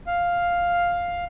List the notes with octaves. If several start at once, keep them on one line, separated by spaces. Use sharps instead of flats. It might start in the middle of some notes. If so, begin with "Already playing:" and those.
F5